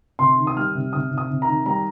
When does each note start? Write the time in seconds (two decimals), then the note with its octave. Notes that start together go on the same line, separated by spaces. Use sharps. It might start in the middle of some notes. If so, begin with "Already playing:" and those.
0.19 C3 C6
0.38 D#3
0.47 D#6
0.56 G3 F6
0.75 C3
0.93 C3 D#6
1.11 C3
1.18 D#6
1.30 C3
1.42 A#5
1.48 D#3
1.66 G3 A#5